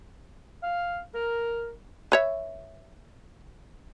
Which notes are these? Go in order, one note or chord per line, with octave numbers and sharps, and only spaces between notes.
F5
A#4
B4 C#5 E5